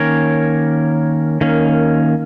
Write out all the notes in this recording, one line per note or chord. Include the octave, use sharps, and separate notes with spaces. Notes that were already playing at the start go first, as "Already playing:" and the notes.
Already playing: D#3 A#3 C#4 A#4 C#5
D#3 A#3 C#4